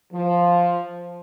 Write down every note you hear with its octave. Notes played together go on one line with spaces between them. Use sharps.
F3